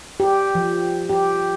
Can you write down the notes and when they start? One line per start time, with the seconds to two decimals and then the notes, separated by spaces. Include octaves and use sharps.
0.20 G4
0.55 F3
1.09 G4